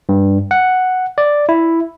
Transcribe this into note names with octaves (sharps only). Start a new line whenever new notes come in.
G2
F#5
D5
E4